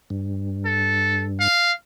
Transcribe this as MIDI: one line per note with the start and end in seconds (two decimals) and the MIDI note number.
0.10 1.48 43
0.65 1.25 69
1.40 1.72 77